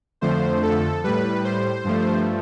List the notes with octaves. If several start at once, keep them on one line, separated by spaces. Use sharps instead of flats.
F2 D3 F3 A3 C5
A4
A2 G3 B4
C5
G2 F3 A3